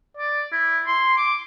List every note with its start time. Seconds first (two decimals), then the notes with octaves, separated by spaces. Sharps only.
0.17 D5
0.52 E4
0.87 C6
1.18 D6